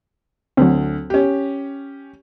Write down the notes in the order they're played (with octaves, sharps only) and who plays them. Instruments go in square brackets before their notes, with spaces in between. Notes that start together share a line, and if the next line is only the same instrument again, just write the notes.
[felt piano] D2 [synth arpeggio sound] F#3 C4
[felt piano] C#4 G4